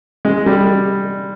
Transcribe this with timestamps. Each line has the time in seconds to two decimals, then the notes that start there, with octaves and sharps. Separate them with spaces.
0.25 G#3
0.46 G3